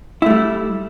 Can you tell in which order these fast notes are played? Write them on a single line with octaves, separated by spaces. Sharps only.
E4 A3 G3